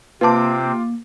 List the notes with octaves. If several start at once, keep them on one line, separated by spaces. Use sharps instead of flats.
C3 A#3 C4 F4 B4 A5 D6